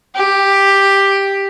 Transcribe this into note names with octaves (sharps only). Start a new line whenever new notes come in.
G4